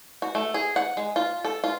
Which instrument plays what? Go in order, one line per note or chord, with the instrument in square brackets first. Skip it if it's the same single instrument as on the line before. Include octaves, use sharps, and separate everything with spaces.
[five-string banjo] F#4
A3
G#4
F#5
G#3
F4
A4
F4